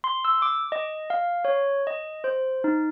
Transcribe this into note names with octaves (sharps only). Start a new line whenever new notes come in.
C6
E6
D6
D#5
F5
C#5
D#5
C5
D#4